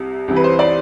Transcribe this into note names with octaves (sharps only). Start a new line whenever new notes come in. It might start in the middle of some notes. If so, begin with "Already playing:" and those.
Already playing: C2 C3
C2 C3 E3
B4
C5
D5